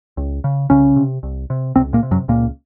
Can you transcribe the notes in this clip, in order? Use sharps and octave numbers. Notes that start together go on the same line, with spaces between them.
C#2
C#3
C2 C#3 C#4
C3
C2
C3
C#2 C3 C4
A#2 A#3
C3
F#2 F#3
C#2 A#2 A#3